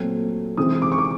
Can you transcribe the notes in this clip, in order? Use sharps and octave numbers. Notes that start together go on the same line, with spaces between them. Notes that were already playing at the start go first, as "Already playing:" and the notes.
Already playing: A#2 F#3 A3 C4
C3 E3 G#3 C4 D#6
D6
C#6
D6